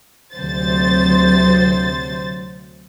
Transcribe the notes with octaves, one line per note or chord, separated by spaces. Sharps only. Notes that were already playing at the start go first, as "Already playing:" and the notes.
D2 C3 F#3 C5 A6